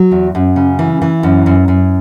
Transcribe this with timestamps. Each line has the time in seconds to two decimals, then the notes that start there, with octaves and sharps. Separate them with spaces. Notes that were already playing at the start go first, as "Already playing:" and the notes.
Already playing: F#3
0.11 E2
0.35 F#2
0.56 C#3
0.79 E3
1.02 E3
1.23 F#2
1.46 F#2
1.68 F#2